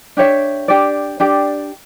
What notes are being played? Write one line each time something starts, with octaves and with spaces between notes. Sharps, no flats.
D4 G4 C#5 E5
D4 G4 D5
D4 G4 D5